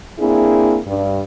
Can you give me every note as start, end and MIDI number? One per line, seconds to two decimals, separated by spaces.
0.19 0.78 58
0.19 0.78 60
0.19 0.78 62
0.19 0.78 64
0.19 0.78 68
0.86 1.22 43